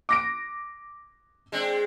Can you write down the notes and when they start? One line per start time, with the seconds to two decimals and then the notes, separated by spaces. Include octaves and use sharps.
0.09 D6 A#6 D7
1.52 G#3 C4 D4